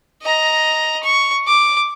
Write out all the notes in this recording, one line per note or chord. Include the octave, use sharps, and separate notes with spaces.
D#5 A#5
C#6
D6